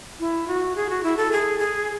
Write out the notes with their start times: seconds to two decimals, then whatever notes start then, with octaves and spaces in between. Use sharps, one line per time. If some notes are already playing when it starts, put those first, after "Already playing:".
0.20 E4
0.48 F#4
0.76 G#4
0.90 F#4
1.03 E4
1.17 A4
1.32 G#4
1.59 G#4